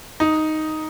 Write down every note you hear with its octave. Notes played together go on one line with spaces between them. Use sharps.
D#4